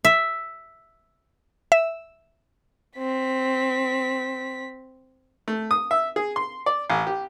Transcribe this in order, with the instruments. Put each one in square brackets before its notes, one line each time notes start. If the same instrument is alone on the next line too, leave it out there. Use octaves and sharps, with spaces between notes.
[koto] E5
[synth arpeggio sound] E5
[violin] C4 B6
[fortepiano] A3
D#6
E5
G#4
C6
D5
A1
G4